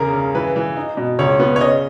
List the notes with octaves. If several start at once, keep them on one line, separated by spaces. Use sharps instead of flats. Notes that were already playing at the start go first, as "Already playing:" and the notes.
Already playing: E2 C#3 A#4
C#3
E3 B4
E3
D#4
B2
C#2 C#5
B3
C#5
C#3 D#5